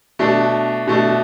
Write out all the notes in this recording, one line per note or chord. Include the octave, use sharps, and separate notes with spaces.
B2 A3 D4
B2 A3 D4